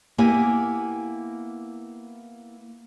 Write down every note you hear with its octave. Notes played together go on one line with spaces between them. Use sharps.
A#3 B3 E4 G4 G#5